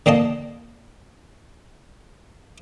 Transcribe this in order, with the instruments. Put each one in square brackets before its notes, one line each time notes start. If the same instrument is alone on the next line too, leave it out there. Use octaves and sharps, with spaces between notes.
[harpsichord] D3 A#3 D#5 A5